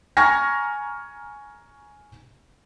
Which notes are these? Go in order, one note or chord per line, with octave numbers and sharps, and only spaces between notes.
G#5 A#5 C#6 F6 G#6 A#6